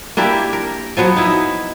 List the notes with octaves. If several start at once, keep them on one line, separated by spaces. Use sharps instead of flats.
A#3 D4 E4 G4
A#4
F3 F#3 B3
D#4 E4